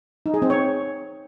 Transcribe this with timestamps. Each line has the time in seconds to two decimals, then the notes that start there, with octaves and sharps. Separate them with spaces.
0.26 D#4
0.34 G#4
0.42 C4
0.50 C#5